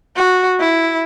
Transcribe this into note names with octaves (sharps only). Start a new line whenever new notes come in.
F#4
E4